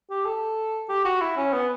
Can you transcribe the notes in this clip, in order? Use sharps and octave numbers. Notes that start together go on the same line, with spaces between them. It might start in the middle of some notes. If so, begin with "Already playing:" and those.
G4
A4
G4
F#4
E4
C#4
B3